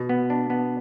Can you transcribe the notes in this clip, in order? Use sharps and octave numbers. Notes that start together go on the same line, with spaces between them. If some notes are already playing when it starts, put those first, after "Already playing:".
Already playing: B2
B3
D4
B3